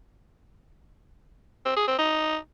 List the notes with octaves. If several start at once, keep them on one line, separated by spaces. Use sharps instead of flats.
C4
G#4
C4
D#4